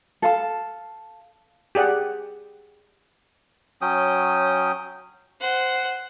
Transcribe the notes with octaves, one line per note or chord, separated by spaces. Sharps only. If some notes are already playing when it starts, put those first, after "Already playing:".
A4 F5 A5
G4 G#4 D5 F#5
F#3 C#4 G5 D#6
C5 F#5